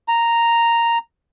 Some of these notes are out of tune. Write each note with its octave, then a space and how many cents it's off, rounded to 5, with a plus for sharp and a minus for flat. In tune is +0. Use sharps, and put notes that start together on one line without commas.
A#5 -5